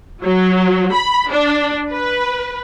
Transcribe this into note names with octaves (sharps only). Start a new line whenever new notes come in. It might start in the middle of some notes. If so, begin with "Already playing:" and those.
F#3
B5
D4
B4